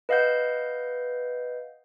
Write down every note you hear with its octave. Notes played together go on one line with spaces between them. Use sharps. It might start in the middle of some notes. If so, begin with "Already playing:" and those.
B4 D#5 F5 F#5 G6